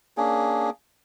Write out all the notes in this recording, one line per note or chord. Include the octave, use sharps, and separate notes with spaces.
A#3 C#4 D4 G#4